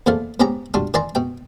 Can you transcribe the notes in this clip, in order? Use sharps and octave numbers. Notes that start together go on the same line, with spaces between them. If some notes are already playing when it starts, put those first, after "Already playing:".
E2 A#2 F3 A3 F5
G#2 B3 C#4 G4 A#5
G3 D4 F4 F#4
D#3 E3 D5 G#5 A#5 C6
B2 G5